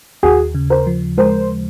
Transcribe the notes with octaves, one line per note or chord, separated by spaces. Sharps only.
D#2 F#4 G#4
C#3
A#4 C5
F3
G#3 A#4 C5